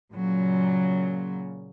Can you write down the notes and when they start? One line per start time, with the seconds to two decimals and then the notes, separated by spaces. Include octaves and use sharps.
0.13 A#2 C#3 F#3